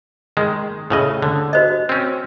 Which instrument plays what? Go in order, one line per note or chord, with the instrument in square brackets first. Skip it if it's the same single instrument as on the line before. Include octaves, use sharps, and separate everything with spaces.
[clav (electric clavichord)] D#3 G#3
A2 C#3 D#5
D3
[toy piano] F#4 C5 D#5
[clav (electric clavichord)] C4 C#4